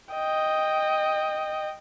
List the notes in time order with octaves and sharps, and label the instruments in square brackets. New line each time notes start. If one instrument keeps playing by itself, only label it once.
[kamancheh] D#5 G5